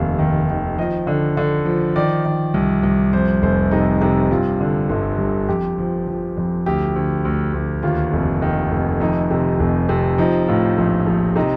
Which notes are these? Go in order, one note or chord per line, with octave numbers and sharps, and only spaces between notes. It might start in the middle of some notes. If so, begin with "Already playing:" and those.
Already playing: F1 D#2 F5
D#3
D#3
F3 D#5
D3
D3
F3
D#3 D5
D#3
C2
C2
F2 C5
F1 C5
C3 D#4
C3 D#4
G2 F4
D3
G1
G2
F2 G4
F3
F3
F2
D2 G4
D2
D2
D2
D#2 F4
F1
D#3
F1
F2 D#4
C3
F1
C3
F3 D#4
A2 F4
A#1
A#1
C3 D#4